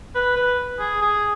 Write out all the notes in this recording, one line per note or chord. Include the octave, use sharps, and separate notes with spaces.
B4
B4
G#4
G#4